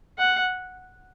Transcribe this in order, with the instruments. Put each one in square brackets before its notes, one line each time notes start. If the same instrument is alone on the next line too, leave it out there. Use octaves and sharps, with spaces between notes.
[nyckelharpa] F#5